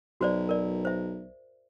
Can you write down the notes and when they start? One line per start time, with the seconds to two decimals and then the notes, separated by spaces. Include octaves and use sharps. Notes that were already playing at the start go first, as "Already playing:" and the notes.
0.21 B1 F#4 C5 D5
0.49 A#4 D5
0.85 C5 E5